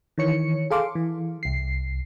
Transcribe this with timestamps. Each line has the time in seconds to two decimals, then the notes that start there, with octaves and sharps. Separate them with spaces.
0.18 D#3 E3 C#5 C#7
0.71 G#4 A4 F5 C6 D6
0.95 E3
1.43 C2 C7